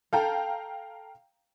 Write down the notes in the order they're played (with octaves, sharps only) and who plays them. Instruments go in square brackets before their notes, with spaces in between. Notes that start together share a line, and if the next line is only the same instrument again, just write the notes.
[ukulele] A4 [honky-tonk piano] F5 G5 A#5